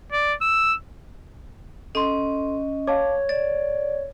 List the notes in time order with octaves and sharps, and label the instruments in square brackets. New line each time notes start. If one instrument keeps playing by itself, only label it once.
[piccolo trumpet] D5
E6
[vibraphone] C#4 D#5 [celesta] A4 C6
[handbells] C#5 [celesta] F5 A5 D6
[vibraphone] D5 [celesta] A6